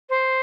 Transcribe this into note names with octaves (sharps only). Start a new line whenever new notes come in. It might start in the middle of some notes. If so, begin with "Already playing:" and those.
C5